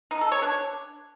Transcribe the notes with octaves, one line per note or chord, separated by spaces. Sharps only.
D#4
A4
C#5
D4